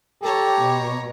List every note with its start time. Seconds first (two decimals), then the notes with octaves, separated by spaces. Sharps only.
0.23 G4 A4 C#5 A#5
0.61 B2